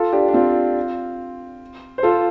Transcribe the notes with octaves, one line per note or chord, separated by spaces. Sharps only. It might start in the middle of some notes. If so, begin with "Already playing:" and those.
Already playing: F4 A4
D4 G4
D4
C4 F4
C5
F4 A4